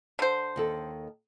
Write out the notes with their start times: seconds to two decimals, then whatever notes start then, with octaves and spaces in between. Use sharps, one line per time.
0.19 D3 C5
0.56 D#2 D#3 A4